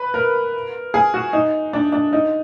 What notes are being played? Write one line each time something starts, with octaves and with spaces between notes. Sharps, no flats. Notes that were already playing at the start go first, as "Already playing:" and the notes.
Already playing: B4
A#4
G#4
F#4
D#4
D4
D4
D#4